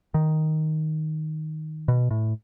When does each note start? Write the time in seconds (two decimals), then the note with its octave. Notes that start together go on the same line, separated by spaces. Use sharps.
0.14 D#3
1.88 B2
2.11 A2